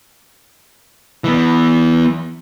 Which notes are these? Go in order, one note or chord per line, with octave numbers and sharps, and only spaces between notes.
E3 B3